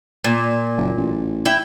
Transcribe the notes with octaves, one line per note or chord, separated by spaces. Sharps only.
A#2
F#1
A1
E4 G5